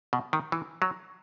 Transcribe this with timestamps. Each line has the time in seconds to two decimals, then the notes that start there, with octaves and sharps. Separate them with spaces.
0.13 B2
0.33 D#3
0.52 E3
0.82 F#3